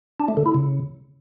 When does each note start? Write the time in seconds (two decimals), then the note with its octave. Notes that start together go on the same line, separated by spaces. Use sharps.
0.20 D4
0.28 A3
0.37 D3
0.46 E4
0.54 C#3